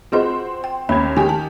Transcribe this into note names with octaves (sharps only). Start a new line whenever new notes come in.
C4 F4 F#4 G#4 C5 D#5
G5
D#2 C#4 B5 G#6
D#3 G4 G#5
A5